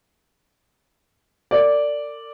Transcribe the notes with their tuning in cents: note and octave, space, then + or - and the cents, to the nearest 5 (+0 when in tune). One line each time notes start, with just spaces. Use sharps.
A#4 -40 D5 -5